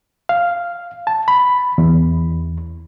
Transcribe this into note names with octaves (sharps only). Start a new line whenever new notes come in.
F5
A5
B5
E2